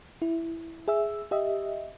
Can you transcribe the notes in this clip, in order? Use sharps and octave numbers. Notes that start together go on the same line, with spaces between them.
E4
G#4 E5 E6
G4 D#5 E5